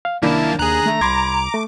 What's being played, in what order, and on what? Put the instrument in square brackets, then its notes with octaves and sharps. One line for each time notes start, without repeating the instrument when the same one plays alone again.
[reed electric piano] F5
[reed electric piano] C2 D#3 D4 [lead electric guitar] F#2 A5 [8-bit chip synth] A#3 [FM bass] E4
[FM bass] D#2 [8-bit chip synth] G#4 F#6 [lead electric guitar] A#5
[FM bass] A3
[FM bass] C2 [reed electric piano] B5 C6 G#6 [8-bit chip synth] D6
[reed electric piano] A3